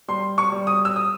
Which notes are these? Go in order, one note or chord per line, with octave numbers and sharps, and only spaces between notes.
G3 C6
C#6
G3
D#6
E6
D#6